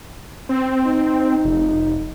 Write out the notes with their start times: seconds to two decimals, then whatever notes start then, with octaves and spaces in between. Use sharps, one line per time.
0.49 C4
0.87 D#4
1.45 F1